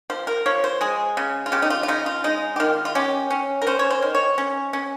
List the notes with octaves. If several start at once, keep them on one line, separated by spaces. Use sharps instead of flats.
F3 C5
A#4
F3 C#5
C5
G#3 G#4
C#3
F4
C#3 G4
D#4
F4
F4
C#3 D#4
F4
G#3 D#4
G4
D#3 F4
F4
C#4 G4
C#4
A#4
C#4 C5
C#5
C5
D#3
C#5
C#4
C#4